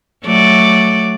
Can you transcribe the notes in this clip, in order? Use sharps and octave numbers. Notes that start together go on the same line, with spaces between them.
F#3 A3 D5